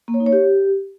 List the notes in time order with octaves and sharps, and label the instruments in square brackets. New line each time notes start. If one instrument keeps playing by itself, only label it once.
[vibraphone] A#3
C#5
D#4
C#5
G4